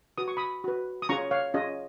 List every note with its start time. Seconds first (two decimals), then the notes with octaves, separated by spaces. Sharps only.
0.18 F#4 B4 D#6
0.28 C#6
0.37 B5 D#6
0.64 F#4 B4
1.02 D#6
1.09 C#4 F4 G#4 C#5 A#5 C#6
1.31 C#5 F5
1.54 C#4 F4 G#4 C#5 D#5